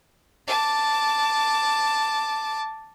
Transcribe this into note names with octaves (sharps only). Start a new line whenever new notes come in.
A5 D6